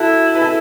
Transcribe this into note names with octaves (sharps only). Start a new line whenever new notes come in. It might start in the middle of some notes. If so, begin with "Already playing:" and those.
Already playing: E4 F#4 A4
B4
A4